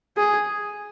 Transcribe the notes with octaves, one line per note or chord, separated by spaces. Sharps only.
G#4